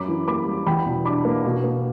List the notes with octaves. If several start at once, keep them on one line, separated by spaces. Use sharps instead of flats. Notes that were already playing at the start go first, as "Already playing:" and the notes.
Already playing: F#2 B5 D6
E3
A#3 B5 D6
G3
E2 G5 B5
B2
D4 B5 D6
A#3
B2
A#3